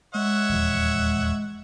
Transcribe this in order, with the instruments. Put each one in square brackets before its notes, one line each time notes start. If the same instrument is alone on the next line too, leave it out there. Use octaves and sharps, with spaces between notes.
[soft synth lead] G#3 [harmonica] C#5 E5 F#5
[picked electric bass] D#1 E2 F3